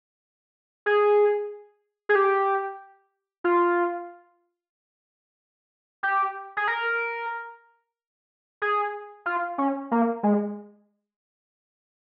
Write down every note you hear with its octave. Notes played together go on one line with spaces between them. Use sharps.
G#4
G#4
G4
F4
G4
G#4
A#4
G#4
F4
C#4
A#3
G#3